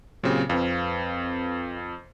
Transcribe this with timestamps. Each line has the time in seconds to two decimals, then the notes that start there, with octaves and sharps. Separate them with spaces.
0.23 A#2 C#3 F#3 C4 G4
0.50 F2 C4 B4 F5